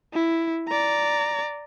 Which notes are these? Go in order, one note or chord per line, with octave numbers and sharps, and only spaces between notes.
E4
D5 A#5